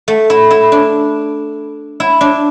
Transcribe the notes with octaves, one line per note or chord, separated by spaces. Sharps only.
A3
E4
E4
D4
E4
D4